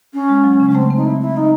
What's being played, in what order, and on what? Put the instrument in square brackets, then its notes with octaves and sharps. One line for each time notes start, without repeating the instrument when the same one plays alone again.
[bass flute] C#4
[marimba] G#3
F#3
C#3
[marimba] G#3 [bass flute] C#4
[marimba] A3 [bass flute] C4
[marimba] C4
[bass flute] D#4
E4
E4
D#4